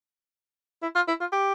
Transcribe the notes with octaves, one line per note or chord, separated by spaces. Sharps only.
E4
F4
E4
F4
G4